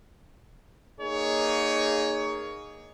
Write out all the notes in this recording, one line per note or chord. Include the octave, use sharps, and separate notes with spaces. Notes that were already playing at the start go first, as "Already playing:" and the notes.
A#3 D#4 G#4 C#5